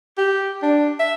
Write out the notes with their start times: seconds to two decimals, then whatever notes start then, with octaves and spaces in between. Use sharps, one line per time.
0.18 G4
0.62 D4
0.99 E5